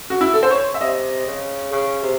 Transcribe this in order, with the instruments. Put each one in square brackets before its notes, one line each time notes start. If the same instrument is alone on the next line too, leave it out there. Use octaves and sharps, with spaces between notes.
[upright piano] F#4
E4
A4
C5
C#5
E5
[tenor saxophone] C3 [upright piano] D#5
[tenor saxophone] C#3
C#3
C3